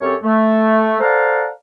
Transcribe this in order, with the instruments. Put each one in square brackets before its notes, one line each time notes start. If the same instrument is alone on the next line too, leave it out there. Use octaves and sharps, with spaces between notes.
[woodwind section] F#2 C4 G4 A4 C#5
A3
A4 C5 D5 F5 F#5 A#5